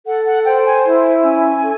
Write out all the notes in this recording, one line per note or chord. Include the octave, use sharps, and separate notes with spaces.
A4 F#5
F#5
C5 G5
G#5
E4
C#4 G#5
A4